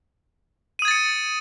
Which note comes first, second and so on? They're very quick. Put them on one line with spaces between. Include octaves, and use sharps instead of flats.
D#7 D#6 G#6 A6 C#7